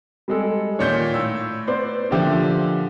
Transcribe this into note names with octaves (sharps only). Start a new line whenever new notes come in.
G3 G#3 A4
A#2 D#3 C#5 D5 G6
A2 E6
B3 C5 D5
A#2 D3 F3 D4 G4 E5